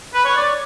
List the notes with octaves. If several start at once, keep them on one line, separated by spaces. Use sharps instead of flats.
B4
C#5
D5